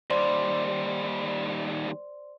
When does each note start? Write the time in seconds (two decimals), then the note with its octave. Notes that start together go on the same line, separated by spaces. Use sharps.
0.10 D#2 G3 C5 D5 C6